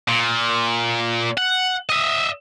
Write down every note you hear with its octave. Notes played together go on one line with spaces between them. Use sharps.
A#2
F#5
D#5 E5